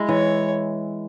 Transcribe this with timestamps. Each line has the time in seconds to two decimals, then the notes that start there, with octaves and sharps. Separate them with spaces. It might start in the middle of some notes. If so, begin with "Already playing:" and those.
Already playing: G#3 E4
0.09 E3 C#5